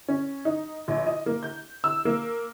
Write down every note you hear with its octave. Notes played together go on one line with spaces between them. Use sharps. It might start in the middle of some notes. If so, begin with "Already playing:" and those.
C#4
D#4
A#1
D#5
A#3
G6
E6
A#3